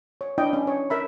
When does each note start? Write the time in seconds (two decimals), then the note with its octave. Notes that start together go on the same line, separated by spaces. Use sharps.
0.21 C#5
0.38 D4 E4 D#5 G5
0.53 C#4
0.67 C#5
0.90 A#4 E5 B5